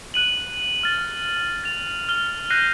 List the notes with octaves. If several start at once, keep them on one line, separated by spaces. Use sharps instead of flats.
F#6 D#7 F#7
F6 A6
A6 F7
F6 G7
F#6 G6 A#6 C7 D#7